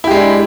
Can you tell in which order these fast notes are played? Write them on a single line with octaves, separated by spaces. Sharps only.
E4 G4 G#3 D4